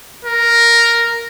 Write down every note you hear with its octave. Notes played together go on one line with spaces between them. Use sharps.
A#4